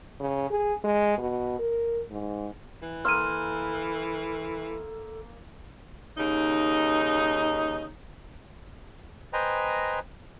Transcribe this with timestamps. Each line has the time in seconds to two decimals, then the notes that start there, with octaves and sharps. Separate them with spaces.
0.20 C#3
0.50 G#4
0.84 G#3
1.18 B2
1.59 A#4
2.11 G#2
2.82 E3
3.05 A#3 A4 C6 E6 F6 D#7
6.17 D#2 C#3 D#4
9.33 B4 C5 D#5 G5 G#5 A#5